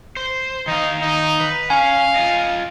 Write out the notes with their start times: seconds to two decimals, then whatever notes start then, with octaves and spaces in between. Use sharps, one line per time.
0.17 C5
0.67 D#3 D#4 F5
1.02 D#4
1.40 B4
1.70 C#4 F5 G#5
2.16 F4 D#5